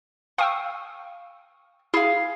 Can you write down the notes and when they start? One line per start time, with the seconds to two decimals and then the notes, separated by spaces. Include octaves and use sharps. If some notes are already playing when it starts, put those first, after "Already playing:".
0.38 F5 G5 C#6 D#6 E6
1.94 E4 G#4 F5